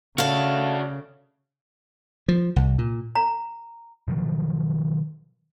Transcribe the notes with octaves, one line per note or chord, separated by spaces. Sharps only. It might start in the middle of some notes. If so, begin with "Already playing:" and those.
C#3 A3 D4 F#4 A4 F5
F3
C2
A#2
A#5
B2 D#3 F3 F#3